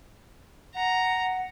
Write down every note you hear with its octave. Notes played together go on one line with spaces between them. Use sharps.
F#5 A#5